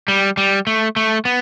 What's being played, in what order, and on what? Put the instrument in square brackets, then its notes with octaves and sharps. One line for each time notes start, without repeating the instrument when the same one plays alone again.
[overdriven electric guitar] G3
G3
A3
A3
B3